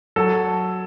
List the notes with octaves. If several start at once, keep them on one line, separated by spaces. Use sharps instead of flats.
F#3 A4